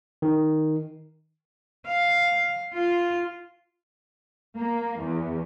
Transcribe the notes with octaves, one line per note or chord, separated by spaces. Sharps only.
D#3
F5
F4
A#3
E2